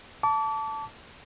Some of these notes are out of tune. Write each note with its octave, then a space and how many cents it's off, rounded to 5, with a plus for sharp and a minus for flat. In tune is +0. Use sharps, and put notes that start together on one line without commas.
A5 +0 D6 -35